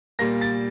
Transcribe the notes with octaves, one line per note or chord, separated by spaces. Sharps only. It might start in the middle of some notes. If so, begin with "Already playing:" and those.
A#2 G3 A#3 A#6
A6